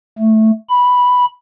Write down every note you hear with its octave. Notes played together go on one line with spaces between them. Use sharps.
A3
B5